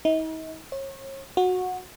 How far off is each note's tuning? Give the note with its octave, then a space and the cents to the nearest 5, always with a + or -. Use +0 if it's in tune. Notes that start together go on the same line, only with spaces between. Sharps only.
D#4 +40
C#5 -35
F#4 -15